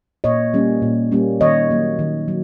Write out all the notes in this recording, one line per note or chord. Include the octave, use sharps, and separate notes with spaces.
A#2 C#5 D#5
G3 A#3 C#4
A#2
G3 A#3 C#4
D#3 C#5 D#5
F#3 A#3
D#3
F#3